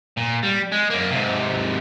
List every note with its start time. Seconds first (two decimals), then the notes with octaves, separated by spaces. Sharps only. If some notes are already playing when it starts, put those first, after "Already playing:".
0.17 A#2
0.43 G3
0.72 G#3
0.90 F#2 A#3
1.11 G#2 C3